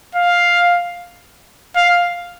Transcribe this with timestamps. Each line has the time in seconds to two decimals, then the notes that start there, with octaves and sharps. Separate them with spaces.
0.15 F5
1.76 F5